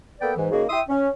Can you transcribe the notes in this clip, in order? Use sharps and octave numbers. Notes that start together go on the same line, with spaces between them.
A#3 B3 A4 B4 D5 G5
G#2 E3
C#3 A#3 D#4 F#4 G#4
E4 E5 G5 C6 D#6
C#4